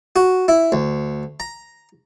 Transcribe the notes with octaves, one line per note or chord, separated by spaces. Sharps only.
F#4
E4
D2
A#5